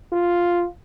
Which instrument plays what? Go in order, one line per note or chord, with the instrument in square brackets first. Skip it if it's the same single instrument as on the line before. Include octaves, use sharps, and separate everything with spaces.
[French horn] F4